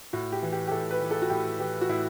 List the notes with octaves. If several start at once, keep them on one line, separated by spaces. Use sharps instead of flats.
A2 F#4
G4
E3
G4
G4
A2 A4
B4
E3
A4
F#4
A2 G4
E3 G4
F#4
A2 E4